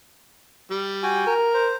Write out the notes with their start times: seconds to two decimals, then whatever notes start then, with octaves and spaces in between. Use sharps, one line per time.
0.71 G3
1.03 F#4 G5 G#5
1.27 A#4
1.54 C5